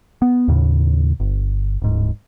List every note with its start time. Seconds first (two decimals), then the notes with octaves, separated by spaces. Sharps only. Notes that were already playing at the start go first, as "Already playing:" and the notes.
0.22 B3
0.48 D#2 A2 C#3
1.20 G1
1.82 D1 G#2